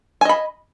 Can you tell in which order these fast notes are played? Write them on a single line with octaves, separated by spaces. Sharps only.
G#5 D#5 B5